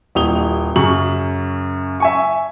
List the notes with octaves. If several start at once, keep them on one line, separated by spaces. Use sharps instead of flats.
D#1 E4 D#6 F7 G7
F#2 C#3 C#6 F#7
E5 G#5 C#6